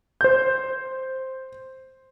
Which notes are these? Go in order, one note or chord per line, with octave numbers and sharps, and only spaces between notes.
C5 G6